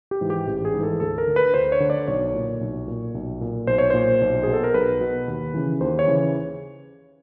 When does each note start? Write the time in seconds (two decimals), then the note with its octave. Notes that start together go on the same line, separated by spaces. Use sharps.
0.11 G4
0.21 G#2 E3
0.30 G4
0.47 A1
0.65 G#4
0.74 G#2 E3
0.83 A4
1.00 D2 A4
1.18 A#4
1.27 D3
1.36 B4
1.54 D2 C5
1.72 C#5
1.80 D3
1.90 D5
2.08 B1 C#5
2.34 A#2
2.61 B1
2.88 A#2
3.15 B1
3.41 A#2
3.67 B1 C5
3.78 C#5
3.90 A#2 C5
4.22 B1
4.43 B2 G#4
4.53 A4
4.64 A#4
4.74 B1 B4
5.01 B2
5.28 D#2
5.54 C#3 E3
5.80 D#2 C5
5.99 C#5
6.07 C#3 E3